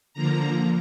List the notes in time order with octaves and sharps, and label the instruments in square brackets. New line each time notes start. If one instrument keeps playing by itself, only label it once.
[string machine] D3 F3 A#3 A#5